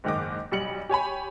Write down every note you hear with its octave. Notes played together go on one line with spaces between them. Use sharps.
F#1 G#2 D#3 D#5 D6
B1 G3 C#7 F#7
G4 C#5 G#5 B5